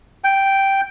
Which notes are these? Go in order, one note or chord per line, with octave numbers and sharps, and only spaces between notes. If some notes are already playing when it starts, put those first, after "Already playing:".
G5